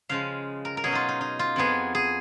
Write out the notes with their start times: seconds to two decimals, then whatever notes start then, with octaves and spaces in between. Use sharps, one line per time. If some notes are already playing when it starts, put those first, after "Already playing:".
0.09 C#3 F3 G#3 F5
0.65 A#4
0.77 A#4
0.84 B2 F#3 C#4 G#4
0.92 D#4 F4
1.09 D#4
1.21 D#4
1.39 F4
1.56 F2 F3 B3 G#4
1.95 G#4